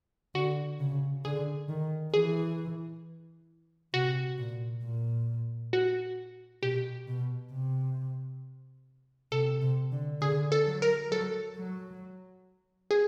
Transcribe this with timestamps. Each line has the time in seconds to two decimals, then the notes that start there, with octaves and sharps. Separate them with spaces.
0.35 D3 F#4
0.80 C#3
1.25 D3 G#4
1.69 D#3
2.14 E3 G#4
3.94 C3 F#4
4.38 A#2
4.83 A#2
5.73 F#4
6.63 B2 G4
7.07 B2
7.53 C3
9.32 C3 A4
9.62 C3
9.92 D3
10.21 D3 G#4
10.52 A4
10.67 F#3
10.82 A#4
11.11 F#3 A4
11.57 F#3
12.91 G#4